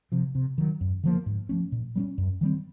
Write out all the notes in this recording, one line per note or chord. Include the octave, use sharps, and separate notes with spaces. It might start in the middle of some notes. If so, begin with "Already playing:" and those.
C3 F3
C3
D#3 F#3
F#2
D3 F3 A#3
G#2
F3 A3 C#4
A#2
G3 A#3 C#4
F#2
D#3 G3 C4